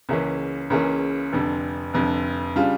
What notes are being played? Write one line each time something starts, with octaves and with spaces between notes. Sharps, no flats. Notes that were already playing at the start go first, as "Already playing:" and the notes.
C#2 C#3 E3 A#3 C#4
C#2 C#3 E3 A#3 C#4
F1 F2 D3
F1 F2 D3
C#3 G3 D4 F4